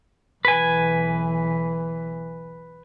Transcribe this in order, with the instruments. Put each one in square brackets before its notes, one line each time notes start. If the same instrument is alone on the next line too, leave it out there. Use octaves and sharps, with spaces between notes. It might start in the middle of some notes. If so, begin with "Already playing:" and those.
[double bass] B1 E3 [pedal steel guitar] B4 G#5